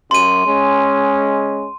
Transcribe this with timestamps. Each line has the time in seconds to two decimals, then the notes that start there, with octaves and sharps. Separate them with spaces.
0.11 F#2 C6 D#7
0.45 G#3 C#4